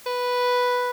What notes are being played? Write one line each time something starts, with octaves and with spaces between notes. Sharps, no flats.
B4